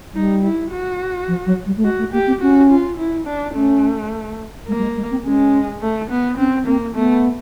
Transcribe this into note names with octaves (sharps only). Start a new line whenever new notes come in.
G3 D#4
E4
F#4
F3
F#3
G3
A3
G#3 F#4
A3
A#3 G4
C4
C#4 F#4
F4
E4
D4
A3 C#4
G#3 A#3
G3
G#3
G#3
C4
G#3 C#4
A3
B3
C4 C#4
A#3 C4
A3 B3